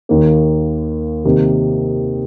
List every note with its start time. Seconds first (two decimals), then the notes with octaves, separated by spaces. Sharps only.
0.09 D#2 D#3 A#3
1.25 C3 D#3 A#3 D#4 G4